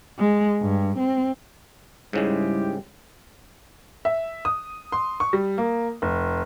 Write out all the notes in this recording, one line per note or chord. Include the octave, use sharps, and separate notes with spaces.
G#3
G2
C4
G#2 C#3 G3 G#3 E4 G4
E5
D#6
C6
C#6
G3
A#3
F1